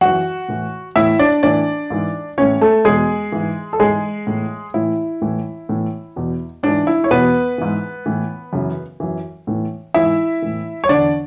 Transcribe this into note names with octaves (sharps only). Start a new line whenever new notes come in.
F#2 E3 F#4 F#5
A2 E3
A2 E3 E4 E5
D4 D5
A2 E3 D4 D5
G#2 E3
A2 E3 C#4 C#5
A3 A4
E2 B2 G#3 G#4
G#2 E3
A4
G#2 E3 G#3 G#4
A2 E3
A2 E3 E4
A2 E3
A2 E3
E2 B2
G#2 E3 D4
E4
C#5
E2 B2 B3 B4
G#2 E3
A2 E3
F#2 C#3 E3
F#2 E3
A2 E3
G#2 E3 E4 E5
A2 E3
C#5
E2 D3 D4 D5